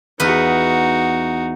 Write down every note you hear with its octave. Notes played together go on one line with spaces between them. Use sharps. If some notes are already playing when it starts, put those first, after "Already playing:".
E2 D#4 F#4 B4